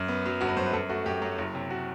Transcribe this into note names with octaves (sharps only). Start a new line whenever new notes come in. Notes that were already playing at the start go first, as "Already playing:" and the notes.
Already playing: F#2
B3
F#3
G1 F#4
B4
F#2 C5
B4
F#2 A4
A3 F#4
F#2 G4
F#3
F#1
C3
F#4